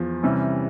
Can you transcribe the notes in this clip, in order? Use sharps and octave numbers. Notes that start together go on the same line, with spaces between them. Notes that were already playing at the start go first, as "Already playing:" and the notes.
Already playing: E2 F3
C3 E3 G3 C#4